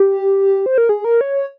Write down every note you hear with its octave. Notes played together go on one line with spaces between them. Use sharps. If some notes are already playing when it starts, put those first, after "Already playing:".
Already playing: G4
C5
A#4
G#4
A#4
C#5